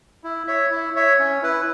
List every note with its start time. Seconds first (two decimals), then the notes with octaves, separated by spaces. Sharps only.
0.24 E4
0.47 C#5 E5
0.71 E4
0.96 C#5 E5
1.19 C#4
1.43 E4 B4